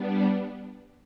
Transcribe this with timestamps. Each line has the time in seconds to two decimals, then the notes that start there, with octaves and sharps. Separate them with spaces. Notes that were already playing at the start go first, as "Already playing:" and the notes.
Already playing: G3 B3 D4